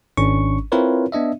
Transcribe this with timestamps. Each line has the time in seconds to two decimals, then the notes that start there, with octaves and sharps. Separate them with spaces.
0.17 G#1 C#4 D4 C#6
0.72 C4 E4 F4 A#4 B4 C#5
1.12 B3 D4 D#5 E5